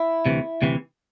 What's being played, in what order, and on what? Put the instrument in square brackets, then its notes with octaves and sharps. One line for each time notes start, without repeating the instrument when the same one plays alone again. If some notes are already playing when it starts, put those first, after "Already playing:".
Already playing: [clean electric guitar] E4
D2 C3 E3
D2 C3 E3